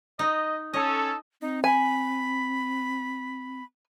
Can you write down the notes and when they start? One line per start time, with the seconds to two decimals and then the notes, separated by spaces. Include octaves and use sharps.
0.19 D#4 D#5
0.74 C#4 A4 D#5
1.41 C4 D#4
1.64 G#5 B5